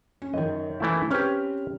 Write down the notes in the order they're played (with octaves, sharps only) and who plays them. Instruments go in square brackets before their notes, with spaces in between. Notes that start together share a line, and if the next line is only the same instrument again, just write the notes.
[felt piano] C#4
[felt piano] F#2 D#3 [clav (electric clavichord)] D#5
[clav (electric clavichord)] E3 A3 E4
[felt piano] C4 B4 F6 [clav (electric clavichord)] C#4 G4